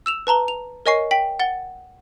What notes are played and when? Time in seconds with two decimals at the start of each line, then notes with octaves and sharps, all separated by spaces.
0.06 E6 E7 F7
0.27 B4 A5 A#5 G7
0.48 F7
0.86 A#4 C#5 D#5 G#5 C#6 C7
1.11 G5 B6 F#7
1.40 F#5 A6 G7